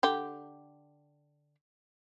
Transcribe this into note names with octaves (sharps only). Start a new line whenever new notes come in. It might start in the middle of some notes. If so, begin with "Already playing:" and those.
D3 G4 G5